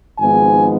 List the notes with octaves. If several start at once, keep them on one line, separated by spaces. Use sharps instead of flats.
G#1 G#2 F3 G#3 B3 G#5